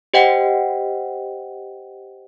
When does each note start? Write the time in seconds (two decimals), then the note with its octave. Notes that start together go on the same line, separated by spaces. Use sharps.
0.14 G4 C5 D#5 F#5 G5